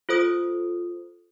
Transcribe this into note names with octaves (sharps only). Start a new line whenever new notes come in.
F4 A4 C5 D#6